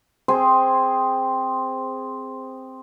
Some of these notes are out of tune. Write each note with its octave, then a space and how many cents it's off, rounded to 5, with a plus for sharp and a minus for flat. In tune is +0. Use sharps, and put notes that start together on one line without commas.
C4 +0 G#4 +0 C5 -5